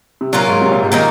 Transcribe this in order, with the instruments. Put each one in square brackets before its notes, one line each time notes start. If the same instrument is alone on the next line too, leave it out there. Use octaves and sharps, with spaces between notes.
[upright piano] C3
[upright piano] A#2 [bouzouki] F#3 C#4 F4 A#4
[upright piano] G#2
C3
A#2
G#2
[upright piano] A#2 [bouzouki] D#3 A#3 D#4